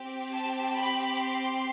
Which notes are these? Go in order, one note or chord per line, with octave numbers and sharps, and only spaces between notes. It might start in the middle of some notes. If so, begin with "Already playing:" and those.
Already playing: C4 G4
A5
B5
C6